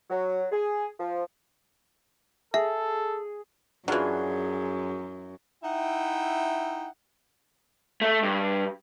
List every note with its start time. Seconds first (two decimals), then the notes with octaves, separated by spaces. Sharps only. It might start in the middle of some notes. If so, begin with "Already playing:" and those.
0.10 F#3
0.52 G#4
0.99 F3
2.54 G#4 A4 E5
3.88 F#2 E3 F#3 D4 F4 F#4 G#4
5.63 D#4 E4 E5 F#5 G5
8.02 A3
8.23 G2